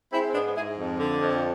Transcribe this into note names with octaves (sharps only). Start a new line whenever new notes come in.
G#3 C4 E4
C4
G#2 B3 D4
B3
G#2 E4 G#4
F2
D3
F2